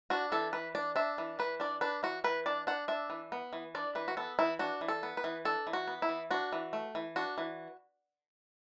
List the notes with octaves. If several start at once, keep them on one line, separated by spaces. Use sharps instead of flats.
D4 F#4
E3 A4
E3 B4
D4 D5
D4 E5
E3
E3 B4
D4 D5
D4 B4
E3 F#4
E3 B4
D4 D5
D4 F#5
D4 E5
E3
B3
E3
D4 D5
E3 B4
F#4
B3 A4
E3 E4
D4 F#4
E3
A4
B3
B4
E3
D4 A4
E3
F#4
B3
E4
E3
D4 F#4
E3
A3
E3
D4 F#4
E3